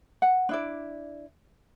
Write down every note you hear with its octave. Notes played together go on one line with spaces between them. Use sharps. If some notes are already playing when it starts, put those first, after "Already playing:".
F#5
D4 E4 D5